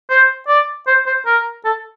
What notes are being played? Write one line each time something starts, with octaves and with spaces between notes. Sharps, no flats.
C5
D5
C5
C5
A#4
A4